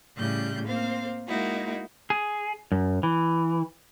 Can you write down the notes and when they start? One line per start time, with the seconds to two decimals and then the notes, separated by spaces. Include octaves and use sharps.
0.16 A2 C#3 G3 F#6 G6
0.67 A#3 C4 C5 F5
1.28 G#3 A#3 D#4 E4 F#4
2.10 G#4
2.72 F#2
3.03 E3